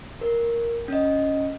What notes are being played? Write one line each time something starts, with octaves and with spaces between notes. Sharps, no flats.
A#4
C#4 D#5